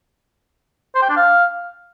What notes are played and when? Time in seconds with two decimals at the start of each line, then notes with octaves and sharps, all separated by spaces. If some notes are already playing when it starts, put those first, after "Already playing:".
0.95 C5
1.02 G5
1.10 D4
1.17 F5